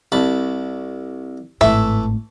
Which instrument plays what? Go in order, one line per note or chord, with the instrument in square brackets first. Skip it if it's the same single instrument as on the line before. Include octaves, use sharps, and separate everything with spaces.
[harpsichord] C2 A5 B5
[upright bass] G#1 A2 [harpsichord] E3 A3 [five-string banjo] E5